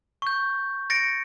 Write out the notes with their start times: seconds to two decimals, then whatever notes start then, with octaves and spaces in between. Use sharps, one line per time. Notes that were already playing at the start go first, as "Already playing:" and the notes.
0.22 C#6 G6
0.90 A6 A#6 C#7 D7